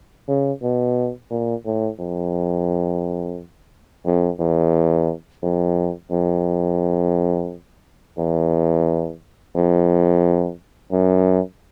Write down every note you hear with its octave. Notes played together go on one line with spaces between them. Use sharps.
C#3
B2
A#2
A2
F2
F2
E2
F2
F2
E2
F2
F#2